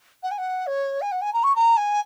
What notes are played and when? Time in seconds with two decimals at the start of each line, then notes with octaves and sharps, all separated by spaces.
0.23 F#5
0.31 G#5
0.38 F#5
0.67 C#5
1.01 G#5
1.12 F#5
1.22 G#5
1.33 A#5
1.44 C#6
1.56 A#5
1.77 G#5